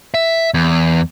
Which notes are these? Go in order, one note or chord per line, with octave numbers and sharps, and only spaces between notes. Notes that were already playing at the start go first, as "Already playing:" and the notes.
E5
E2